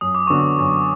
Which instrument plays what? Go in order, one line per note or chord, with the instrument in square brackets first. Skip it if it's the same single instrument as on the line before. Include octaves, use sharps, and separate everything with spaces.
[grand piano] F#2 [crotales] D#6
[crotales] D6
[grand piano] D3 F#3 B3 [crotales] C#6
[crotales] D6
[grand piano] F#2